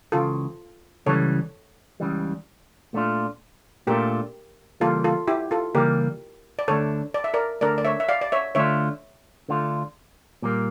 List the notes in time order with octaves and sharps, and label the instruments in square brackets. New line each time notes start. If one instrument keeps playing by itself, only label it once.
[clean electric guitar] C#2 C#3 E3 [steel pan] F4 A4
[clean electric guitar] C#2 C#3 E3 G3 [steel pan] A4 C#5
[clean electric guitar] C#2 C#3 E3 G3
A#2 A3 D4 F4
[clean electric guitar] A#2 A3 D4 F4 [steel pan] G4 A#4
[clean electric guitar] C#3 E3 G3 A#3 [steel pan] F4 A4
[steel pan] F4 A4
E4 G4
F4 A4
[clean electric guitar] C#3 E3 G3 A#3 [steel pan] G4 A#4
[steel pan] D5
[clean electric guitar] D2 D3 A3 D4 [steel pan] A4 C#5
[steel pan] D5
E5
A#4 D5
[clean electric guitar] D2 D3 A3 D4 [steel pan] A#4 D5
[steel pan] D5
C#5 E5
E5
D5 F5
D5
C#5 E5
[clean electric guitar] D3 A3 D4 F4 [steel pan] C#5 E5
[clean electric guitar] D3 A3 D4 F4
A#2 G3 A#3